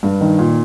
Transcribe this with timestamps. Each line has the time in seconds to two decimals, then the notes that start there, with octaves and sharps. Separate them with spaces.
0.03 G2
0.21 D#3
0.38 A#2